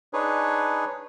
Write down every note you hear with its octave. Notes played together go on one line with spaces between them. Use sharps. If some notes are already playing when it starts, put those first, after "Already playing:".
D4 D#4 G#4 B4 C#5